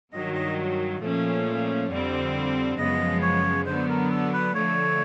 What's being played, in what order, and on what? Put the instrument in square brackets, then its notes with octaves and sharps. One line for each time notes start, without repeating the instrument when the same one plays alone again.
[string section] G2 D#3 F#3 [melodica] D#5
[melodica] D#5
[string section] A#2 F3 A3 C#4
F2 D3 G3 C4
[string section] F#2 C#3 F3 G#3 B3 [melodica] D#5
[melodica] C#5
[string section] D3 F#3 B3 [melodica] C5
[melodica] A#4
A4
B4
[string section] D3 F3 A3 [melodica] C#5